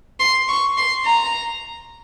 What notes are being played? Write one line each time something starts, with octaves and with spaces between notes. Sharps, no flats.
C6
C#6
C6
A#5